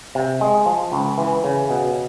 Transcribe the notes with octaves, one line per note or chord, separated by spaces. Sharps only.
C3
G#3
F3
C#2
E3
C#3
B2